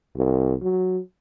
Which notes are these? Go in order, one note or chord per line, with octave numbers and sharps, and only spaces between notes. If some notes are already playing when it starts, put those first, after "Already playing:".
C2
F#3